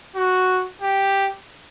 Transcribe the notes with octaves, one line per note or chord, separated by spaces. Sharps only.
F#4
G4